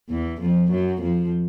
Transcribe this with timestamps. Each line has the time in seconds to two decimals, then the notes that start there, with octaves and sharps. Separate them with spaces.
0.10 E2 E3
0.41 F2 F3
0.71 F#2 F#3
1.01 F2 F3